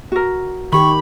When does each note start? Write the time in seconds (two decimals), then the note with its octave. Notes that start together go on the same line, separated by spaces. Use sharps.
0.12 F#4 A#4
0.73 D#3 G4 B5 C#6